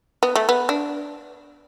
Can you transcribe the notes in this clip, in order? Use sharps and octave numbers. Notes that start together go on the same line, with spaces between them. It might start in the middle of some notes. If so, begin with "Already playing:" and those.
B3
A3
B3
D4